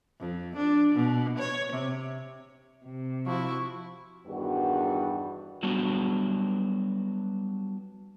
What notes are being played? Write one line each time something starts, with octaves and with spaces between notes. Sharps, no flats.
F2
D4
B2
C#5
C3
C3
F3 E4 F#4 C#6
E2 G2 D#3 F#4
F#3 G3 B3 D4 F#4